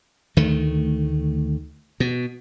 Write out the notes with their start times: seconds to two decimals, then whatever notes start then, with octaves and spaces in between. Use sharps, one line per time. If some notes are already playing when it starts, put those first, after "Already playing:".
0.37 D2 D#3 A3
2.00 B2